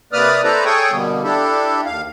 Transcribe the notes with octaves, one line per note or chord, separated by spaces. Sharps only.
C3 A#3 B4 D5 D#6 F6
E4 A4 B4 C5 D5 A#5
G#4 A4 C#5 G5 C#6 D#6
B2 D3 G3 A#3 B3
D4 E4 G4 A4
D#2 F5